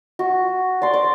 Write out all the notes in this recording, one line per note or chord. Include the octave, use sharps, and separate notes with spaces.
F#4
D5 C6
D5